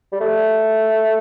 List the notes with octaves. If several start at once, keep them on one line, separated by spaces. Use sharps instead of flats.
G3
A3